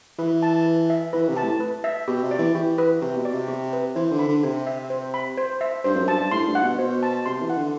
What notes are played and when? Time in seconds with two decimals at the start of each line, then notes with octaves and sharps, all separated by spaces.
0.19 E3 B4
0.43 A5
0.66 B4
0.90 E5
1.13 E3 B4
1.29 C3
1.37 A5
1.44 A2
1.60 B4
1.84 E5
2.08 B2 G4
2.23 C3
2.31 D5
2.39 E3
2.55 E3 G4
2.78 B4
3.02 C3 G4
3.17 B2
3.25 D5
3.34 C3
3.48 G4
3.73 B4
3.95 E3 C5
4.12 D3
4.19 B5
4.28 D3
4.43 C3 C5
4.67 E5
4.90 C5
5.14 B5
5.37 C5
5.61 E5
5.84 G2 C5
5.96 F#2
6.07 G2 A5
6.20 G2
6.31 A2 C6
6.47 G2
6.55 F#5
6.62 B2
6.78 B2 C5
7.03 A5
7.26 C3 C6
7.42 E3
7.50 F#5
7.57 D3